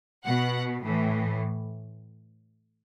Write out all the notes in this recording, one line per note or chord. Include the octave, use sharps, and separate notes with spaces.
B2 F#5
A2 E3